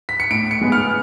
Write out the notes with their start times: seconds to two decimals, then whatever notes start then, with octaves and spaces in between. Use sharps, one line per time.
0.09 B6
0.20 C#7
0.31 A2 D7
0.51 C#7
0.61 G#3 B3
0.72 F6